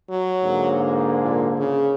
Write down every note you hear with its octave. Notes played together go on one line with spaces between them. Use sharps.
F#3
G#2 D3 A#3
A#2
C#3